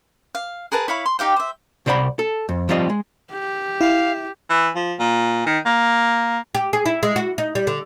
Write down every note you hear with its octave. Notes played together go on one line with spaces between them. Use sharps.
F5
G#4 A#4 B4 A5
E4 C#5 F5 B5
C6
D#4 G4 F5 G5
C5 E5
C2 C3 C5 D5 F#5 B5
A4
F2
F3 G3 C4 F4 G4 D#5
G#3
G4
E4 F5
E3
F3
A#2
D#3
A#3
G4
G#4
E4
G#3
F#4
D#4
G3
D3